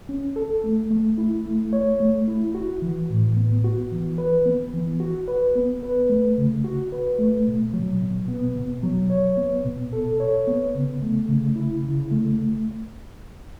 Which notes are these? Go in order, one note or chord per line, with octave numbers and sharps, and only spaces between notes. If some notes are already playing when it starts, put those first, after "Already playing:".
C#4
A4
A3
A3
E4
A3
C#5
A3
E4
F#4
E3
A2
B3
F#4
E3
B4
B3
E3
F#4
B4
B3
B4
A3
C#3
F#4
B4
A3
B2
F#3
B2
B3
B2
F#3
C#5
B3
B2
A4
C#5
B3
C#3
A3
C#3
E4
C#3
A3